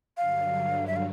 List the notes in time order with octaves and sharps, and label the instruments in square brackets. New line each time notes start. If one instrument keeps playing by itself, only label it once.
[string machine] G2 D3 F#3 [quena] F5
[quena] E5
F5